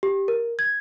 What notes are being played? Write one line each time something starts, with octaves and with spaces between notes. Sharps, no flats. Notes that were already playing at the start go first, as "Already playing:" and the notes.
G4
A#4
G#6